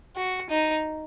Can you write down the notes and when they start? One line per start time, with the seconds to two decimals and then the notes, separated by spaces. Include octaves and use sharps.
0.16 F#4
0.50 D#4